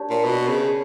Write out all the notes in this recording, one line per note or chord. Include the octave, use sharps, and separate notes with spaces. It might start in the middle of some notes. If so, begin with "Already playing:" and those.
Already playing: D4 G4 A#4 C#5
A#2
B2
C#3